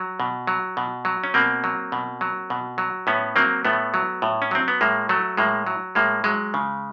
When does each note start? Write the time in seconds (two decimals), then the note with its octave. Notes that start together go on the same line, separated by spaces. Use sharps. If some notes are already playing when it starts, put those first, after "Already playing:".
Already playing: F#3
0.20 B2
0.47 F#3
0.77 B2
1.05 F#3
1.24 C#4
1.34 B2 A#3 C4
1.64 F#3
1.92 B2
2.21 F#3
2.50 B2
2.78 F#3
3.07 A2 B3 C#4
3.36 F#3 A#3 C4
3.65 A2 A3 B3
3.94 F#3
4.22 A2
4.42 C#4
4.51 F#3 C4
4.68 B3
4.81 A2 G#3 A#3
5.09 F#3 A3
5.37 A2 G#3 A#3
5.66 F#3
5.95 A2 G#3 A#3
6.24 F#3 G#3
6.54 C#3